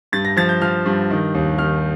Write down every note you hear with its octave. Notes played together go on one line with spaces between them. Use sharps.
G2 A6
A#6
F3 A6
G6
F3 F6
G2
D#3
D#2
D#3 F6